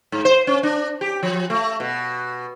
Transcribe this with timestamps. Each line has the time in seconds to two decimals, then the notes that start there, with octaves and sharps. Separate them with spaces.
0.12 G#2
0.25 C5
0.47 C#4
0.63 D4
1.01 G4
1.23 F3
1.50 A3
1.80 B2